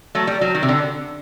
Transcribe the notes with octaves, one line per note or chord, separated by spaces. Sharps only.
F#3 A3
G3
F#3
D#3
C3
D3